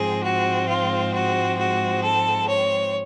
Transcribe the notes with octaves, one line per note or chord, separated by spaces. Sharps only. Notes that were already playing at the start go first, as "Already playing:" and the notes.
Already playing: G#2 F3 G#3 C4 G#4
F#4
F4
F#4
F#4
A4
C#5